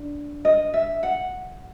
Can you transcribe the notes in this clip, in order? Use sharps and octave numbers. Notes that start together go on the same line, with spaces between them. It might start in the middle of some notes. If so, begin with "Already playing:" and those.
Already playing: D4
D#5
E5
F#5